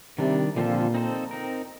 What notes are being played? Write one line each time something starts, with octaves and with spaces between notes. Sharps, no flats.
C3 D#3 G3 D4
A#2 D3 F3 C4 F4 A4
C4 D#4 A4 C5
C4 D#4 A#4